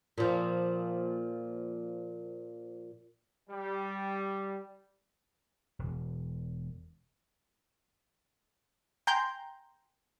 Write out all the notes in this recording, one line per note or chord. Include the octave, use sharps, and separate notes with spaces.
A#2 F3
G3
E1
G5 G#5 A#5 C6 G6